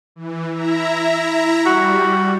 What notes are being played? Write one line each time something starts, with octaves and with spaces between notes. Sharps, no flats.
E3
E4 E5 A#5
G3 F#4